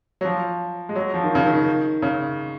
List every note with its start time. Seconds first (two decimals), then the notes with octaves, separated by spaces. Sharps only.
0.21 F#3
0.25 F3
0.89 G#3
0.96 F#3
1.14 F3
1.24 D#3
1.35 C#3
1.46 D#3
2.02 C#3